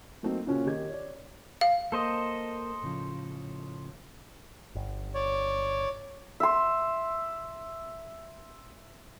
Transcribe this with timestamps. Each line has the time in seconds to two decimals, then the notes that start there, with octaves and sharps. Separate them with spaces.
0.23 F#3 A3 A#3 C4 D#4
0.46 A#2 C#3 C4 C#4 F4 F#4
0.66 D#3 G4 G#6
0.89 C#5 D5
1.61 F5
1.92 A#3 A4 C5 D#5
2.82 A2 C#3 F3
4.75 G1
5.14 C#5 D5
6.40 E5 C6